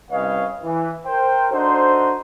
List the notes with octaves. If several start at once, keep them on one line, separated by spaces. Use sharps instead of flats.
C2 C#4 B4 C#5 D#5 F5
E3
A#4 C5 G5
D4 D#4 F#4 A4 C5